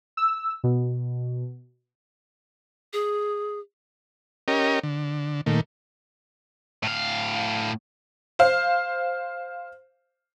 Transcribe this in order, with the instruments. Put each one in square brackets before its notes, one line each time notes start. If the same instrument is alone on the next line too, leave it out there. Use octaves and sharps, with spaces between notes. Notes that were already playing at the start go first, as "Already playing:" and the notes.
[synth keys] E6
B2
[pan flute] G#4
[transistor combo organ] C#4 G4 A#4 D#5
D3
A#2 D#3 A3
[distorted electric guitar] A2 F5
[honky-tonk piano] C5 F5